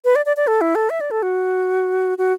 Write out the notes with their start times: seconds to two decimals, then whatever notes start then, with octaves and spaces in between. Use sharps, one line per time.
0.05 B4
0.16 D5
0.26 D5
0.37 D5
0.47 A4
0.61 E4
0.75 A4
0.90 E5
1.01 D5
1.11 A4
1.23 F#4
2.18 F#4